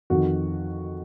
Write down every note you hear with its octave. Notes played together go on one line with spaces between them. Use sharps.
F2 D#3 F#4